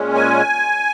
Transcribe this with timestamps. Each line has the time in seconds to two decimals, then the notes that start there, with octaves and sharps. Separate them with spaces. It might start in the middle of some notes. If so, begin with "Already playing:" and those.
Already playing: A#2 G#3 C#4
0.15 G#5